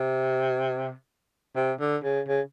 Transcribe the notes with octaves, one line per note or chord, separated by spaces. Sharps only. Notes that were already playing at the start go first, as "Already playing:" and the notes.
Already playing: C3
C3
D3
C#3
C#3